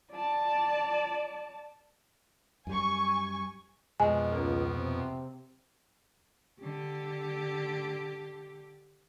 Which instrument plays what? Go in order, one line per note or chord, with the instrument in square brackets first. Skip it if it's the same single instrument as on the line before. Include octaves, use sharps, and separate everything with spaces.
[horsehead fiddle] D5 A5
[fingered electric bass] F#2 G3 [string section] G#5 C#6
[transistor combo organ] F2 B2 [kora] G#3 [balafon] G#5
[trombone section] C#2 [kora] A#3
[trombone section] C3 C4
[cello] D3 G4